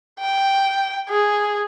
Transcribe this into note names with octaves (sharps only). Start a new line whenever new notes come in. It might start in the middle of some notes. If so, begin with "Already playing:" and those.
G5
G#4